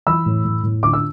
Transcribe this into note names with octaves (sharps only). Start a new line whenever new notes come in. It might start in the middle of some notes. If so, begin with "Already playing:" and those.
E3 B5 E6
A2
A2
A2
D3 D6
E6